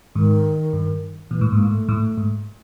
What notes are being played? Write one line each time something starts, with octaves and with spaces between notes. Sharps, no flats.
G#2 D#3
G2
A#2 E3
A2
G#2 A#3
A2
A3
A2
G#2